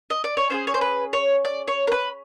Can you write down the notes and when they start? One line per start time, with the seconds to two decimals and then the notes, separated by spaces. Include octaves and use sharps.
0.10 D#5
0.24 D5
0.37 C#5
0.50 C#4 F4 G#4 C5
0.67 C#5
0.74 C5
0.81 B4
1.13 C#5
1.45 D5
1.68 C#5
1.87 A#4
1.92 B4